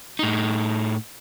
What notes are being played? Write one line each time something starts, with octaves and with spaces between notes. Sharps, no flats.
A2 D#4